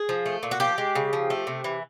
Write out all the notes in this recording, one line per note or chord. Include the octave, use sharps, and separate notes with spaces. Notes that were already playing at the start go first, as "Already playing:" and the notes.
Already playing: G#4
F3
A3
A#2
F#4
F3 G4
G#3
C#3
F3
A3
C3
E3